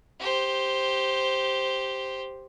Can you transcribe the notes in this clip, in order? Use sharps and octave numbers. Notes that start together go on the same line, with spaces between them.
G4 C5